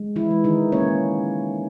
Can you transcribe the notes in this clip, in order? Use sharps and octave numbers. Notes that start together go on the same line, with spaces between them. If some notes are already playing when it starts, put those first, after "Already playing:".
Already playing: G#3
E3 E4
G#3
D#3 D#4
A#3 C#4 C#5